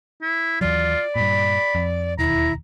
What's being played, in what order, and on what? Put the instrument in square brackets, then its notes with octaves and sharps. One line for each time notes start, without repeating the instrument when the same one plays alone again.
[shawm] E4
[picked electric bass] D#2 E3 F#3 [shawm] F4 [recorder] D5
[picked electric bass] G2 A#2 [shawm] B5
[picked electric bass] F2
[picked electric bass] E1 D#2 [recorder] E4 [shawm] A#5